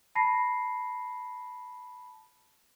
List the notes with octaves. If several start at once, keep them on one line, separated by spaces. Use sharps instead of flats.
A5 B5 A#6 C7